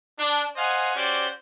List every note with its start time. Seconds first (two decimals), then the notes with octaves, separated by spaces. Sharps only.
0.19 D4
0.56 C5 D#5 F5 F#5 G#5
0.95 C#4 F#4 G4 C5 D5 D6